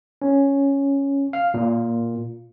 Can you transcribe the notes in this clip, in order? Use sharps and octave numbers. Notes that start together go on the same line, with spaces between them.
C#4
F5
A#2